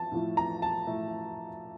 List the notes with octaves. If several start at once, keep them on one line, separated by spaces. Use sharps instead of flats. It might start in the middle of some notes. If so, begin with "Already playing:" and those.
Already playing: F3 A5
A2 F3 A3
A#5
A5
A2 F3 A3